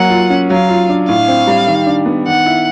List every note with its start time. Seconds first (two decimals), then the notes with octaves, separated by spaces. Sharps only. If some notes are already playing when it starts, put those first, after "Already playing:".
Already playing: F#3 A#3 F#5
0.10 F4
0.30 C#4
0.50 F#3 F5
0.69 F4
0.89 D4
1.09 A2 F5
1.28 C4
1.47 G3
1.67 D#3
1.87 D4
2.06 B3
2.26 D#3 F#5
2.46 E4